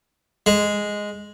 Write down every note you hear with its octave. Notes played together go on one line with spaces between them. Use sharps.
G#3